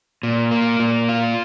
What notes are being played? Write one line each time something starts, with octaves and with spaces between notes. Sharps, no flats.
A#2
A#3
A#2
F4